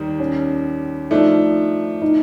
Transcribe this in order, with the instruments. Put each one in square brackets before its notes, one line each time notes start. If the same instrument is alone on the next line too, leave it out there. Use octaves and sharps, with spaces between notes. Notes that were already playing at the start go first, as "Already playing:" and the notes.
Already playing: [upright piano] D#2 D#3 G3
[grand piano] C#4
[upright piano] F3 A3 D4 [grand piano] D#4
[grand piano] D#4